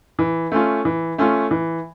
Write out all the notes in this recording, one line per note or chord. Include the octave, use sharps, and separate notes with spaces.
E3
A3 C#4 F4
E3
A3 C#4 F4
E3